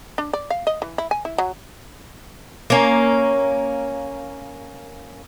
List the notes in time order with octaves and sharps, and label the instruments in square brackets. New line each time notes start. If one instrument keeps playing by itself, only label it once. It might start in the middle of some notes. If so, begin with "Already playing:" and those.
[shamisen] D4
D5
F5
D#5
E3
E4
G#5
E4
F#3
[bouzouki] A#3 C#4